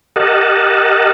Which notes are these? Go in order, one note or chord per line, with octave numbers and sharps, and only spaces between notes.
G4 A#4 D#5 F#5 A5